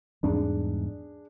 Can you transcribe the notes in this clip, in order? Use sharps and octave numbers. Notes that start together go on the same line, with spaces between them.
E2 G#2 G3 D4 G#4